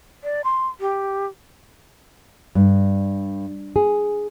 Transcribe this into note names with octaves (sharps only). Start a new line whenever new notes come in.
D5
C6
G4
G2
G#4